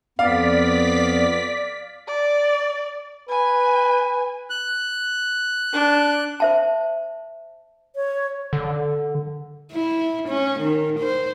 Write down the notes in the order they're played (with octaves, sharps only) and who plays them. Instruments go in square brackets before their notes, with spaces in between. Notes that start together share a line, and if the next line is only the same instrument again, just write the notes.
[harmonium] F2 B3 [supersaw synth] D5 B6 [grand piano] F5
[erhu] D5
[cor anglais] B4 [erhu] G#5
[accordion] F#6
[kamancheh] D4
[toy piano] C5 E5 A5
[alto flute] C#5
[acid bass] D3
[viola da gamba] E4
C#4
D#3
C5